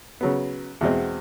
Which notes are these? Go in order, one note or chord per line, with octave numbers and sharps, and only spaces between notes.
C#3 F#3 B3
E2 B2 G#3 C4